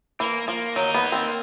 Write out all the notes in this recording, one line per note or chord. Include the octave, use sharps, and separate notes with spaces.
E3 A#3
F3 A#3
F#3 D#4
B3
A#3
C4